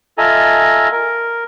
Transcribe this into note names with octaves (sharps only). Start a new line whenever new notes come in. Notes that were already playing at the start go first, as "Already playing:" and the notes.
F4 A4 D#5 E5 G#5 A#5
A#4